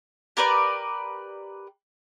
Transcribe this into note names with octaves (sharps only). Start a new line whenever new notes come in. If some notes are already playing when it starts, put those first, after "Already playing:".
G4 A#4 B4 D5